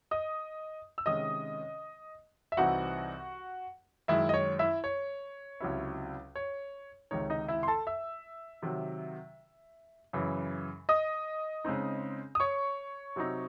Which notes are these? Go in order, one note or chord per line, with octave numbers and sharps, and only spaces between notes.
D#5 D#6
E6
C3 D#3 G#3 C#4 D#5 D#6
E5
C2 C3 E3 C4 D#4 F#4 F#5
F#2 D#3 G#3 E4 E5
D#5
C#5
E4 E5
C#5
C#2 C3 F#3 C#4 E4
C#5
C#2 C3 D#3 G#3 D#4 C#5
D#4 D#5
E4 E5
C6
A4 A5
E5 E6
C3 D#3 F#3
F#2 C#3 E3
D#5 D#6
C#3 G#3 C4 D#4
D#6
C#5 C#6
C3 F#3 C4 D#4